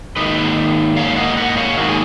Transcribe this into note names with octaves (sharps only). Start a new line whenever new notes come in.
G#2 D#3 A#3 B4 D#5
G#2 D#3 A#3 C#5 F5
D#5 F#5
D#5 F#5
C#5 F5
G#2 D#3 A#3 F#4
G#4